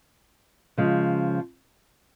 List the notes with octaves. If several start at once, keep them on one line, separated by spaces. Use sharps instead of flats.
C#3 F3 G#3